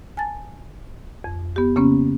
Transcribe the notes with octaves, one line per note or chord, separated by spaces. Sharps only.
G#5 A5 A6
F2
B3 G4
C#3 A#3 B3 C#4